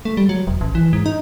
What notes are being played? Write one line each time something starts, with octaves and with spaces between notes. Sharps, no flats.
A3
G3
F#3
E1
A1
E3
G#2
D#4